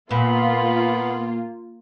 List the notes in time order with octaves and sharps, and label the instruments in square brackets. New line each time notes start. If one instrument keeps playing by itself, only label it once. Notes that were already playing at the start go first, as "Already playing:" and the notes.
[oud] A#2 [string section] A#3 F4 [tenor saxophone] B3 [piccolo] B5